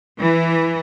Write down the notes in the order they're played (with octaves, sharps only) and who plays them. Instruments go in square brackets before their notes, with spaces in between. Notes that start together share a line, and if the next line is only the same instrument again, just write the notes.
[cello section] E3